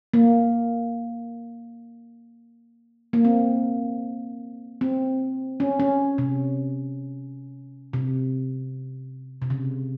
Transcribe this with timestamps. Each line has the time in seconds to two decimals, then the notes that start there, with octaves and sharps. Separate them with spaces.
0.14 A#3
3.13 A#3
3.25 C4
4.81 C4
5.60 C#4
5.80 C#4
6.18 C3
7.93 C3
9.42 C3
9.50 C#3